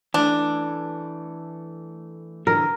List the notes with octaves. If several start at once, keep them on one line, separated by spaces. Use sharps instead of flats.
E3 A3 D4
D3 E3 D4 A#4